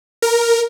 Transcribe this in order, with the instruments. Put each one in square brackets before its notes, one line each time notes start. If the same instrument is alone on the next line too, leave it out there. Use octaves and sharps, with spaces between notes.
[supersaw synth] A#4